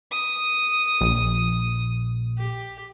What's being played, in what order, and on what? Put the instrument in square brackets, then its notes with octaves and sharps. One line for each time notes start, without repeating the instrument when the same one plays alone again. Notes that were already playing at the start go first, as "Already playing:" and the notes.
[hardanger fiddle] D#6
[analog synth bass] A#1
[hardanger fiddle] G4